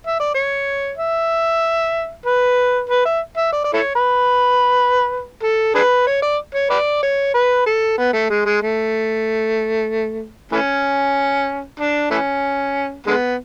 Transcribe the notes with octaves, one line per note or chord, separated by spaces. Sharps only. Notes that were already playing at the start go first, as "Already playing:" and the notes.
E5
D5
C#5
E5
B4
B4
E5
E5
D5
D5
E4 A4 C#5
B4
A4
D4 G#4 B4
C#5
D5
C#5
B4 D5
C#5
B4
A4
B3
A3
G#3
G#3
A3
E3 A3 C#4
D4
E3 A3 C#4
D3 G#3 B3